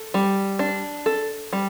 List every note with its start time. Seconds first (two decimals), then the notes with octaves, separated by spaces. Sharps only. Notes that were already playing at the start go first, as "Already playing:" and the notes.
Already playing: A4
0.14 G3
0.59 D4
1.06 A4
1.53 G3